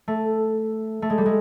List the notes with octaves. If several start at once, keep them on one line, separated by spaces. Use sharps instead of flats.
A3
A3
G#3
G3
G#3